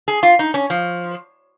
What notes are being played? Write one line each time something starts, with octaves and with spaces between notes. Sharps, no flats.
G#4
F4
D#4
C#4
F3